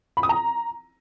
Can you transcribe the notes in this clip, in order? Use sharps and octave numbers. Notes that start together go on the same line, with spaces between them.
B5
D#6
A#5